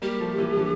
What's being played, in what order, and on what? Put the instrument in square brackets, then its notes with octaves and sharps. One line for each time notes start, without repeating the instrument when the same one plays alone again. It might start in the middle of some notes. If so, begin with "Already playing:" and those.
[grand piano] G3 A#3 [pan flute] G4
[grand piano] F3 A3
E3 G3
D3 F3